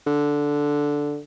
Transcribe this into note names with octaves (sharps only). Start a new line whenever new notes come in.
D3